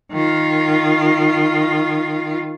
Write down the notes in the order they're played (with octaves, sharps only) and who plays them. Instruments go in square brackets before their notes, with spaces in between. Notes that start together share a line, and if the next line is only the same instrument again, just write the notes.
[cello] D#3 F4